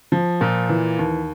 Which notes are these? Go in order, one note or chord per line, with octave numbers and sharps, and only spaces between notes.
F3
A#2
E3
D#2